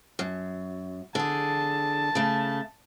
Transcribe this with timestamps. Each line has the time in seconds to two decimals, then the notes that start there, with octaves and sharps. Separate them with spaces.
0.19 F#2
1.15 D3 G#4 A5
2.15 C#3 A3